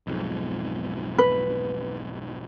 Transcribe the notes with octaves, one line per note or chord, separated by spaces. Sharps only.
B1 F2 G#2
B4